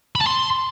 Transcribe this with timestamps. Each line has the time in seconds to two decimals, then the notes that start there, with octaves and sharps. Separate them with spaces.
0.15 B5
0.21 A5
0.27 C6